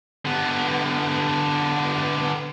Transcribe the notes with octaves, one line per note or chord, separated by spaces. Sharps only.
D3 B3